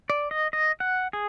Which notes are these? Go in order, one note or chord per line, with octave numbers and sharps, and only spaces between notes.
D5
D#5
D#5
F#5
G#4